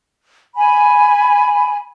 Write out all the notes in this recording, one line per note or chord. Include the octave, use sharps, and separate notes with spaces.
G#5 B5